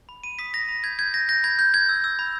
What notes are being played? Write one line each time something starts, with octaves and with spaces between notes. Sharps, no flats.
B5
B5 D#7
D#6 B6
B5 A#6
B5
G6 G#6
G6 G#6
G6 A#6
G6 A#6
B5 G#6
G6
G6 G#6
E6
E6
B5